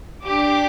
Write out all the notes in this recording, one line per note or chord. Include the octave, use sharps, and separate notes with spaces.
D4 G4 D6